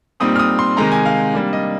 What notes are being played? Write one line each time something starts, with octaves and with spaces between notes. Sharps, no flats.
A#2 G3 C4 D#4 D#6
F6
D#6
C6
C3 D#3 G#3 D#4 A#5
G#5
F5
C3 G3 A#3 D4
D#5